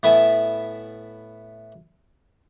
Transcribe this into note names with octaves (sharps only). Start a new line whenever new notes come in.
A2 B3 E4 G#5 A5